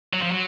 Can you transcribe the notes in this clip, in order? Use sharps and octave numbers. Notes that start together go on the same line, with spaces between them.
F#3
F3
F#3